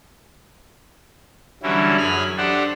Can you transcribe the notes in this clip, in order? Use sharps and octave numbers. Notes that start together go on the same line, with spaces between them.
D3 E3 F#3 G3 C#4 E4
F#2 G#4 B5 F6
D4 G4 A4 C5 F#5